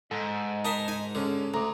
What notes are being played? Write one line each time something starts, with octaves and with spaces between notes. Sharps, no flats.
G#2 A4 D#5
D#4 A#4 A5 C6 B6 E7
D#4 G#5
D3 G#3 C#4 A5
D2 A4 A#5 D6